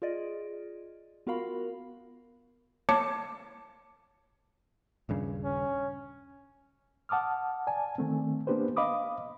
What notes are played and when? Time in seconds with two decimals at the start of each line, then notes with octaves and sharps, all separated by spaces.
0.02 F4 G#4 D5 D#5
1.27 B3 F4 F#4 A#4 F5 B5
2.89 A#3 C#5 A5 D6 C#7
5.09 D#1 G2 C#3
5.45 C#4
7.09 F#5 A5 D6 D#6 F6
7.67 D5 G#5 A5
7.98 D#3 A3 C4
8.47 A#3 B3 D4 G4 B4 C5
8.76 D#5 F5 B5 D6 D#6